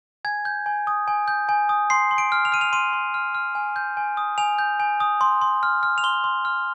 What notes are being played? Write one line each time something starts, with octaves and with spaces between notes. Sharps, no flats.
G#5 G#6
G6
G#5
D#6
G#5
G6
G#5
D#6
C6 C7
C6
D7
F6
F7
F6 D#7
F7
C6 D#7
C6
F6
F6
G#5
G6
G#5
D#6
G#5 F7
G6
G#5
D#6
C6
C6
F6
F6
F7
C6 G7
C6
F6